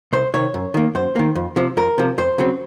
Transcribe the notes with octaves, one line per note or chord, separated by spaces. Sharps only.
C2 C5
C3 D#3 C#5
F#2
D#3 A#3
F#2 C5
D#3 A#3
F2
C3 F3
F2 A#4
C3 F3
F2 C5
C#3 F#3 C4